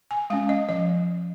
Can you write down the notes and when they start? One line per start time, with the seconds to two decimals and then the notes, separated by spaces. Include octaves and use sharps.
0.11 G#5
0.30 G#3 C#4 F5
0.49 D#5
0.69 F3 D#5